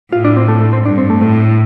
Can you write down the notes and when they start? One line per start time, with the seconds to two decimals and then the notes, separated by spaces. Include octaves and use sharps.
0.13 A2 F4
0.25 D4
0.37 C4
0.48 A3
0.61 A3
0.73 C4
0.85 G2 D4
0.98 C4
1.10 A3
1.21 A2 A3